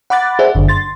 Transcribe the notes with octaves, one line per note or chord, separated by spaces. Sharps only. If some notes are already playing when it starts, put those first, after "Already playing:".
F#5 B5 D6 F#6 A6
G#4 C5 D5 E5 F#5
G1 F#2 D3
C6 A6